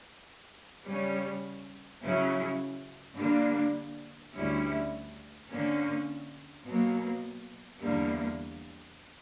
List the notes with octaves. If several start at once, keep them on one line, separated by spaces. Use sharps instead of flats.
C#3 G3 C#4
C#3 F#3 C#4 E4
D3 G3 A#3 D4
D2 D3 G3 C#4 E4
D3 A#3 C#4
B2 F#3 A#3
E2 D3 G3 A#3